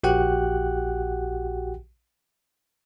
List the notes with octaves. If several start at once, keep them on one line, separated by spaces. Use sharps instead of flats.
A#1 F#4 G4 F#5 G5 F#6